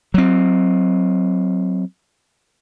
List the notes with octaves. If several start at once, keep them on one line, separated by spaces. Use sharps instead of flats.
F#3 C4